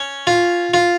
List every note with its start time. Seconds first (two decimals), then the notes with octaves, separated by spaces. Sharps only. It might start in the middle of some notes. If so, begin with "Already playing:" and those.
Already playing: C#4
0.27 F4
0.74 F4